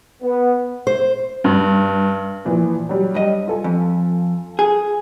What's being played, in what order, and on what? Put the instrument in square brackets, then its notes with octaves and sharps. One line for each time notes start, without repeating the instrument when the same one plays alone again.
[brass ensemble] B3
[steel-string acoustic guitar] C5
[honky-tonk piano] G2
A#2 E3 F3
F#3 G3
[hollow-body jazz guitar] G2 D#5
[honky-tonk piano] F4 A4 G#5
[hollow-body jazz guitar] F2
G#4